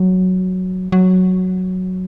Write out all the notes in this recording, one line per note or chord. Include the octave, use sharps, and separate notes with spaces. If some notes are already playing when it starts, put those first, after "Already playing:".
Already playing: F#3
F#3